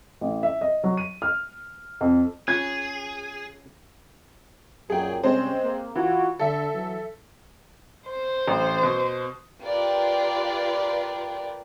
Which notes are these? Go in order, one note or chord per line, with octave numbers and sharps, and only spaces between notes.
A1
E5
D#5
F#3
D#7
F6
F2
C#4 F4 G#4 G#6
F#2 A#2 G#4 G5
C3 G3 G#3 C4 C#4 C5
A#3
E3 F4 F#4
D3 A4 E5
E3 F#3
C5
A1
B2
F4 G4 A#4 B4 D5